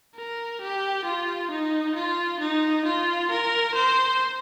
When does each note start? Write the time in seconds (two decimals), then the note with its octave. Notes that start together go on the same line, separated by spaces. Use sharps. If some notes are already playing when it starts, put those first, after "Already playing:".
0.15 A#4
0.61 G4
1.05 F4
1.51 D#4
1.96 F4
2.40 D#4
2.86 F4
3.31 A#4
3.75 C5